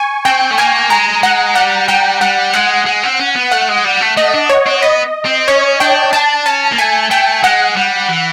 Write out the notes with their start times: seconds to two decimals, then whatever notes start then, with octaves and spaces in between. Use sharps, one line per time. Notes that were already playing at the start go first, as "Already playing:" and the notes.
Already playing: G#5 C#6
0.25 C4 G5
0.51 A3
0.57 A#3 G#5
0.90 G#3 A#5
1.23 G#3 F#5
1.55 G3 F#5
1.88 G3 G5
2.21 G3 F#5
2.53 G#3 F#5
2.86 G#3
3.03 C4
3.19 C#4
3.35 B3
3.52 A3 F#5
3.69 G#3
3.85 G3
4.01 A3
4.17 A3 D#5
4.33 D4
4.49 C#5
4.66 C4
4.82 B3 D#5
5.25 C4
5.48 C#4 C#5
5.80 D4 G5
6.13 D4 A5
6.46 C#4 A5
6.72 A#3
6.78 A3 G#5
7.10 A3 G5
7.43 G#3 F#5
7.77 G3
8.09 E3